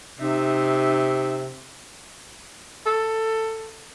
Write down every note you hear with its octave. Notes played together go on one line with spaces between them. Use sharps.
C3 D#4 E5
A4